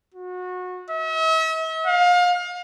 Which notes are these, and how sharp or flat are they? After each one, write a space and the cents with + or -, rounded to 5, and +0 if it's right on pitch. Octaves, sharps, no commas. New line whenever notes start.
F#4 -25
E5 -45
F5 +30